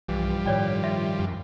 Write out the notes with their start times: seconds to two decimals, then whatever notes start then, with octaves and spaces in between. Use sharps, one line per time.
0.08 B1 G2 E3 F3 G3
0.46 A2 D#3 C#5 D5 G5
0.84 F4 E5
1.20 F#2